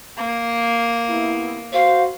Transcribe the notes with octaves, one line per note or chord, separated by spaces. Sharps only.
A#3
C3 B3 E4
F#4 C5 F5